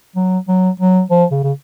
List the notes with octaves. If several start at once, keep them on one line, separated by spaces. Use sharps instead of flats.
F#3
F#3
F#3
F3
C#3
C#3